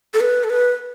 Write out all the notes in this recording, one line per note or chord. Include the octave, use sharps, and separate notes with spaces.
A4
B4
A4
B4